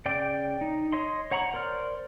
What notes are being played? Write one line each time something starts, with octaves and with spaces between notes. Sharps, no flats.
C#3 D5 G5 D6
D#4
C#5 D#5 C6
C#5 F#5 A#5 B5 C#6
A#4 C5 D5 F6